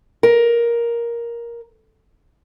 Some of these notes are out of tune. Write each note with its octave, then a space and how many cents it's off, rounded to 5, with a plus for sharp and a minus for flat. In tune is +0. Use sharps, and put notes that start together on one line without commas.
A#4 +10